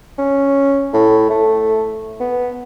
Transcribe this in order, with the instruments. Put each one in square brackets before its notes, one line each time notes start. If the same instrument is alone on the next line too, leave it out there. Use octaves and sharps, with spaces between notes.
[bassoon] C#4
A2
A3
B3